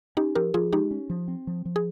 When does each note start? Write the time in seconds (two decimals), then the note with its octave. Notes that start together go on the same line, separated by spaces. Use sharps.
0.17 C#4 D#4 G4
0.35 F3 G4 A#4
0.54 F3 F4 G#4
0.72 G#3 D#4 G4
0.91 C#4
1.10 F3
1.28 C4
1.47 F3
1.65 F3
1.76 G#4